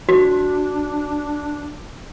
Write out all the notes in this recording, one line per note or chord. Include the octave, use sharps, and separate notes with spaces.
D4 F#4